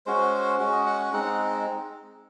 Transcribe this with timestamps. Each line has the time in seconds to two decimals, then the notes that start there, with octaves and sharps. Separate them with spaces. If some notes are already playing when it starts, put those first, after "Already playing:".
0.06 G#3 C#4 F#4 C5
0.59 G#3 C#4 F#4
0.73 D#5
0.86 F#5
1.13 G#3 C4 D#4 F#5